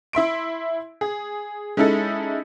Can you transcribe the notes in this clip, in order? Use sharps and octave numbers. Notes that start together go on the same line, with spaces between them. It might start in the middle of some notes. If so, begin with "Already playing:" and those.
E4 E5 C6 D7
G#4
G#3 C#4 D#4 E4 A4